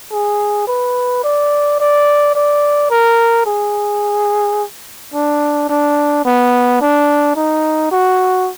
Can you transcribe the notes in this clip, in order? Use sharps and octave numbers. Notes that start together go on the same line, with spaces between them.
G#4
B4
D5
D5
D5
A#4
G#4
D4
D4
B3
D4
D#4
F#4